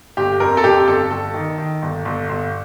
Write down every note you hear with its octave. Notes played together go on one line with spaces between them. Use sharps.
G1 G4
F2 A#4
A4
F2 G4
G1 A4
G1 A4
D#3
D#3
G1
G1
G1